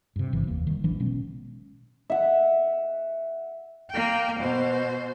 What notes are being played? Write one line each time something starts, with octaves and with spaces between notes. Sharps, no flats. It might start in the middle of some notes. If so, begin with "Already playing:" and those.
G2 C3
G1 E3
F1 D#2 A#3
D#3 G3
A1 E3 F#3 D4
B2 G#3 B3 C#4
E5 F#5
A#3 G5
B2 C5